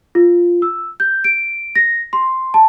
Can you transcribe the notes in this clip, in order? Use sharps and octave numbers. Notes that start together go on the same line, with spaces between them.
F4
E6
G6
D7
A#6
C6
A5